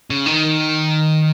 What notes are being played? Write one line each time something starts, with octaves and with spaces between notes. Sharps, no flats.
C#3
D#3